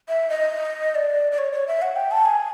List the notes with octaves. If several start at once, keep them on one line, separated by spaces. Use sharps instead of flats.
E5
D#5
D5
D5
C#5
C#5
E5
F#5
G5
A5
G#5